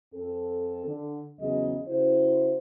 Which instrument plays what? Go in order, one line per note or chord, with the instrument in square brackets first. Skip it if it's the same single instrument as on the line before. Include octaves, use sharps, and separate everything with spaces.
[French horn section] F2 C4 A4
D3
E2 C#3 F#3 G#4 D#5
C#3 E4 F#4 C5